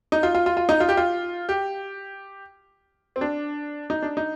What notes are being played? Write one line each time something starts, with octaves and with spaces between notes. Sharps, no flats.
D#4
F4
F4
F4
F4
D#4
F4
G4
F4
G4
C4
D4
D#4
D4
D#4